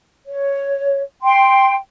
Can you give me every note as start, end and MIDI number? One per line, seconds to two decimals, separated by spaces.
0.25 0.99 73
1.21 1.72 79
1.21 1.72 84